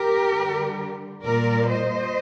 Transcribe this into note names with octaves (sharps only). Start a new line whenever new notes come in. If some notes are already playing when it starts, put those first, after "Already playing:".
Already playing: G4 A#4
D3 G3
A#2 G3 A#4 D5
C5 D#5